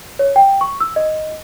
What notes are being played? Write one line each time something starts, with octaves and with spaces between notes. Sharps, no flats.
C#5
G5
C#6
E6
D#5